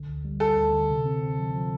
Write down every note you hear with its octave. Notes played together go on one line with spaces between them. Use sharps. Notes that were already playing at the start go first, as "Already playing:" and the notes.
Already playing: A#1 D3
D2
G3
G3 A4
D2
D3
C3
C4
C4
F3
F3